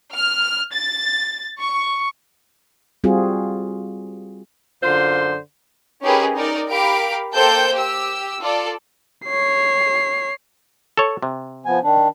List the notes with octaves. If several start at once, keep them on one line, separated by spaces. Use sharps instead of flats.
F6
A6
C#6
G3 C4 F4 F#4 G#4
F#2 D3 F4 C5 C6
C#4 D#4 G4 G#4 A#4 B4
D#4 A#4 D5
G4 A#4 F5 B5 D7
A#3 A4 C5 G5 G6
G4 E6
F4 A4 D5
C#5 C7
A4 C#5
C3
F3 B3 G#5
D#3 D4